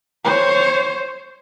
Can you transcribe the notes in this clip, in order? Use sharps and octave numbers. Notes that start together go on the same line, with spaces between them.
C5 C#5